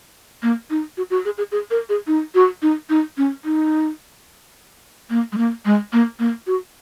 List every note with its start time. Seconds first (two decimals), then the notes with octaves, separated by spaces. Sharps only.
0.43 A#3
0.70 D#4
0.97 F#4
1.10 F#4
1.25 G#4
1.38 G#4
1.52 G#4
1.71 A#4
1.89 G#4
2.07 D#4
2.35 F#4
2.62 D#4
2.90 D#4
3.17 C#4
3.45 D#4
5.10 A#3
5.32 G#3
5.38 A#3
5.65 G#3
5.93 A#3
6.19 A#3
6.47 F#4